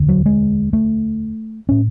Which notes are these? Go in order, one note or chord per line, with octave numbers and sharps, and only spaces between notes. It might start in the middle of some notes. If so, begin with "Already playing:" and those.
Already playing: E1 D2 D3
F#3
G#3
A3
A2 C#4